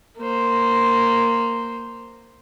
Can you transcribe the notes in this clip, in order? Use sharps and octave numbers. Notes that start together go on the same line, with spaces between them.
A#3 C5